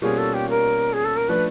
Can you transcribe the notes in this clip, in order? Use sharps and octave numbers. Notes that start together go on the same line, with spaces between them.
B2 G3 A#3 C#4 F4 G#4
A4
G4
A#4
G#4
A4
A#4
F3 A3 D4 B4